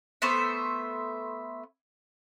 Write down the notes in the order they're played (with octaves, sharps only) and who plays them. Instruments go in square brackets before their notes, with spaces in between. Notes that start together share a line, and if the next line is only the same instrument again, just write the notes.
[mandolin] A3 B3 C5 E5